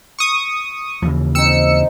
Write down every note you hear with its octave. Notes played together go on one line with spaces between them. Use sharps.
C#6 D#6
D#2 C#3 E3 F3
C4 D#4 E6 C#7